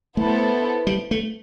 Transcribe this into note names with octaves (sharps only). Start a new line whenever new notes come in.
A3 B3 E4 A4 C5
G3
A3